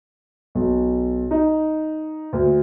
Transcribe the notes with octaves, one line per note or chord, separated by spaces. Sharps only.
B1
D#4
D2